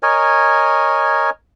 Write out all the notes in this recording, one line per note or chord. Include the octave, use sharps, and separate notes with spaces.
A#4 C#5 D#5 G#5